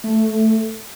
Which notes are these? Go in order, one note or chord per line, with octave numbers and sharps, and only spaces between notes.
A3